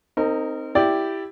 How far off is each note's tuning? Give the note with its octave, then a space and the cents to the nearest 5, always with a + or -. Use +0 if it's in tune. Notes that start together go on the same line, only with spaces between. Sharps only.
C4 +0 D#4 +0 A#4 -35
E4 +0 G4 +0 D5 +0